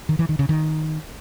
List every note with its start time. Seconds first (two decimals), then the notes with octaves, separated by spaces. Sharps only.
0.09 D#3
0.19 E3
0.29 D#3
0.39 C#3
0.49 D#3